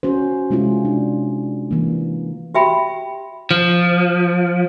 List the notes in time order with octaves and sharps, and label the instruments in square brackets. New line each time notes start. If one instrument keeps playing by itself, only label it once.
[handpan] C#4 F#4 C5
C3 G#3 C#4 E4 F4
D4
E3 A#3
[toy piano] F#4 G4 E5 G5 B5
[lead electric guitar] F3